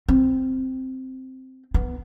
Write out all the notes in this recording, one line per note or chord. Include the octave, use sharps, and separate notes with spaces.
C4
B3